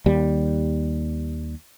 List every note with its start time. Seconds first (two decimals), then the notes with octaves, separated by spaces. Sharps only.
0.06 D#2 G3